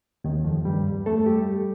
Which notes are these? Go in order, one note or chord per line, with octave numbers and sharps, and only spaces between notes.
D#2 D#3
F2 F3
G2 G3
A3 A4
G3 G4